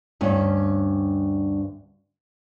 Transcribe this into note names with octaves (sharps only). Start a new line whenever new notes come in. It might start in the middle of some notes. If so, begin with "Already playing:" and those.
D2 G2 C#4